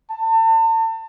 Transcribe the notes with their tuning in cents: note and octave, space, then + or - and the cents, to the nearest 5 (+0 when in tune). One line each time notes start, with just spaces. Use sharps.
A5 +35